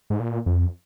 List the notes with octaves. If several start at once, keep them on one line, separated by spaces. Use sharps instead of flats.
G#2
A#2
F2